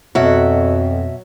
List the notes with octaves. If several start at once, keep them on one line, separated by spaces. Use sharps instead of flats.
F2 B2 F#3 E5